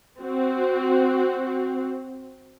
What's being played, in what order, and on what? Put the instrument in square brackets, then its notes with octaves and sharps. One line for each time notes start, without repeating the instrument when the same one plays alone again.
[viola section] C4 F#4